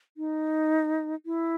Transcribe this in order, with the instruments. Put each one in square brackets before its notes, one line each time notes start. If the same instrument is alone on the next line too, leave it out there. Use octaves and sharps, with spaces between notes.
[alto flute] D#4
E4